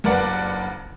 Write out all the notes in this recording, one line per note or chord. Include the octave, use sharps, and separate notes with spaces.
F#1 G2 A#4 B4 D5 F#5